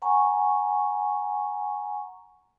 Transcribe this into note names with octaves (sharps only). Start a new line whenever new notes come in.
F#5 G#5 A#5 C#6